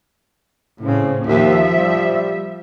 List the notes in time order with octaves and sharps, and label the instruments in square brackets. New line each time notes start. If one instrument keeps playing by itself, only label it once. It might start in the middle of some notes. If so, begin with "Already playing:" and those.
[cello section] A2 C4 [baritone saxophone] C#3
[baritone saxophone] D#2 [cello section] F3 E5
[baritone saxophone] G3